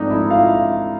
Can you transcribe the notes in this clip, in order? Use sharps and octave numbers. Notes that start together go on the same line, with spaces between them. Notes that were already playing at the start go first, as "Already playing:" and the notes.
Already playing: G#2 F3 A3 C4 D4 D#4 D#5
E4 E5
F4 F5